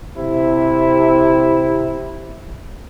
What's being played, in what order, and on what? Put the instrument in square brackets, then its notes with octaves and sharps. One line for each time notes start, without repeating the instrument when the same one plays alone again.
[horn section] C3 E4